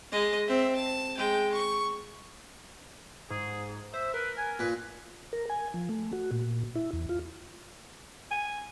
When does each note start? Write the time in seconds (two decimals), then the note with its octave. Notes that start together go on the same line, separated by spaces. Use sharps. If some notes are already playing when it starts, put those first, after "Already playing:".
0.12 G#3 D#5
0.47 C4 E5
0.75 A5
1.17 G#3 G5
1.52 C#6
3.30 G#2 G#4
3.94 C5 E5
4.14 A#4 B4
4.38 G#5
4.59 A#2 B4
5.33 A#4
5.50 G#5
5.74 F3
5.89 A3
6.13 F#4
6.31 A#2
6.76 E4
6.93 E2
7.09 F4
8.31 G#5